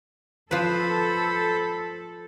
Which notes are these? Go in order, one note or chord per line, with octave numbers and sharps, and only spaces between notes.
F3 A4 B4 C5 B5